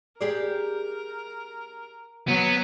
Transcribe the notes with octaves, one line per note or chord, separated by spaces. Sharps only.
G4 G#4 A#4 D5
F#3 B3